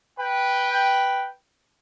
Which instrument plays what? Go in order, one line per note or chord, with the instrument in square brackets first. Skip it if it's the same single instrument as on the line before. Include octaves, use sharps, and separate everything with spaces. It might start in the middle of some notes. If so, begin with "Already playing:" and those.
[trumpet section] B4 G5